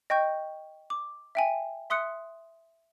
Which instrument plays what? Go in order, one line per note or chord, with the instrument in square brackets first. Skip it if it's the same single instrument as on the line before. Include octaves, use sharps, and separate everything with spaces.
[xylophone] D#5 G5 C#6 G6
D6
E5 G5 G#5
E5 C6 D#6 F#6 C#7